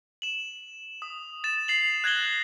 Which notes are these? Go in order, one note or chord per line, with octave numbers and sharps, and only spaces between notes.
E7 F#7
D#6
A6 E7
A6 C7 F7 F#7
F#6 G#6 A#6 F#7 G7